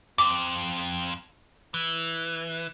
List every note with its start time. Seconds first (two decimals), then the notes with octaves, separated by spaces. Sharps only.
0.18 F2 C4 D6
1.74 E3